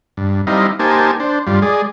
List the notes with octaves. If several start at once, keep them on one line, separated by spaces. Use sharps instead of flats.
G2
G3 C4 D#4 E4 D#5 F5
A#3 D#4 G4 C5 G#5 A5
D4 C5
G2 G3 F4
G#3 G#4 D5